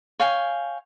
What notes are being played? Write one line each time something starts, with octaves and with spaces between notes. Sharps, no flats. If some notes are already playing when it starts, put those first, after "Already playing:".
C#5 F5 G5 G#5